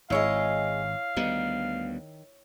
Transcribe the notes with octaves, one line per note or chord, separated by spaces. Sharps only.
G#1 G#2 E4 G#4 C#5 D#5 F5
D2 D#3 G3 B3